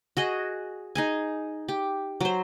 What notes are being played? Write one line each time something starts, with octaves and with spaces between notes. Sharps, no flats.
F#4 G#4 D#5
D#4 G#4 G#5
G4
F#3 C5